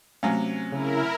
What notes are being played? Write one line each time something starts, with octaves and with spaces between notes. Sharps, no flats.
C3 F#3 A3 C#4
C#3 E4 A#4